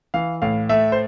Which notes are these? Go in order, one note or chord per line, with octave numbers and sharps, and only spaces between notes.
E3 F5
A2 F5
A3 E5
C5